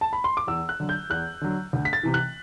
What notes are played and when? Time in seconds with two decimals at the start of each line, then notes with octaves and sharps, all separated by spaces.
0.01 A5
0.13 B5
0.24 C6
0.37 D6
0.47 E2 E6
0.69 F#6
0.80 D3 F#3
0.89 G6
1.10 E2 F#6
1.41 D3 F#3
1.73 D2
1.85 B6
1.93 A6
2.03 C3 E3
2.14 F#6